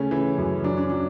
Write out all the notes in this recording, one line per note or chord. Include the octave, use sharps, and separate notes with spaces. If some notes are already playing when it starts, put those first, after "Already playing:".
Already playing: C#3 A3 C#4
E3
F#2
F#3 D4
C#4
F#3 D4